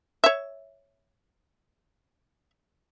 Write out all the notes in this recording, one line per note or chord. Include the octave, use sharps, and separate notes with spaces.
C#5 E5